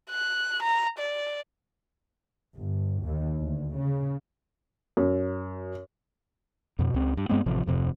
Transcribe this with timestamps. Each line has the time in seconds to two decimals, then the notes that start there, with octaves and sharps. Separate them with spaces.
0.10 F#6
0.63 A#5
0.99 D5
2.57 G1
3.03 D#2
3.40 D2
3.77 C#3
4.97 F#2
6.79 F2 B2
6.94 C#2 C4
7.17 G2
7.29 G2 G#3 B3 C4
7.46 A1 C3 F3
7.66 D1 F2 C3